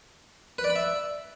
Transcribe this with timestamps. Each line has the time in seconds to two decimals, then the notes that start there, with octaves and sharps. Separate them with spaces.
0.58 B4
0.64 D5
0.70 B5
0.76 E5